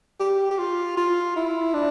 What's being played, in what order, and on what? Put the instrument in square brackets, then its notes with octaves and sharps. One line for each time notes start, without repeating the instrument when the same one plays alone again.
[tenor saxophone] G4
G4
F4
F4
E4
D4